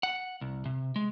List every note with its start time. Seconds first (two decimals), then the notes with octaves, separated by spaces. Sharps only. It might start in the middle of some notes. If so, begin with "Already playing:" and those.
0.03 F#5
0.41 C2
0.65 C3
0.96 G#3